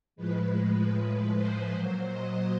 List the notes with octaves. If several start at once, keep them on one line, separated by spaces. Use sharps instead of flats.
A2 F3 G#3 B4
C5
A#2 F#3
D#5